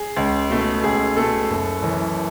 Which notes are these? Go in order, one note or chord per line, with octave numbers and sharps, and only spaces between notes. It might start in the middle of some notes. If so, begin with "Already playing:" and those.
Already playing: G#4
C#2
B2 A3
C#2 G#4
B2 A3 A4
F#1
F#2 E3